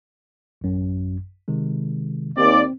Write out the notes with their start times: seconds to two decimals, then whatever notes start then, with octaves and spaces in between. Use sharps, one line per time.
0.61 A1 F#2
1.48 C3 D#3 G#3
2.37 D#2 C4 D5